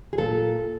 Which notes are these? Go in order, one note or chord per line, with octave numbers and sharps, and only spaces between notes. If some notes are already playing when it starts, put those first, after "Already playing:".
G#4
A#2 A4